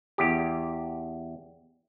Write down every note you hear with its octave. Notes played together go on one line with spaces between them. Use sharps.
E2 G4